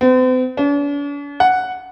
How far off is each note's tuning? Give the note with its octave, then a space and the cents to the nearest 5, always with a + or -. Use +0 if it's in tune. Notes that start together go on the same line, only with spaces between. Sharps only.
C4 -45
D4 -45
F#5 +0